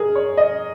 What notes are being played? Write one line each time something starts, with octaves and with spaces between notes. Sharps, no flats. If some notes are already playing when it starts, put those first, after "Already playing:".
Already playing: G#4 A#4
C#5
D#5